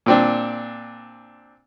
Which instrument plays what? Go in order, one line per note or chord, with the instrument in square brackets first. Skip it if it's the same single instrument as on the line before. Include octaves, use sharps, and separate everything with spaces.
[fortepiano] A#2 C4 D4